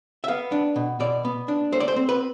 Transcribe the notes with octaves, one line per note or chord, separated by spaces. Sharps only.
E5
B3 F5
D4
B2
B2 D5
B3
D4
A3 C5
D5
C5
C4
B4